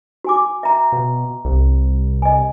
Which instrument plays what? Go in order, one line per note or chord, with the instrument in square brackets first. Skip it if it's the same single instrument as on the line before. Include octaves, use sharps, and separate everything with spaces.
[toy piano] F#4 G#5 D6
E5 A#5
[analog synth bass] B2
C2
[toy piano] D#5 G#5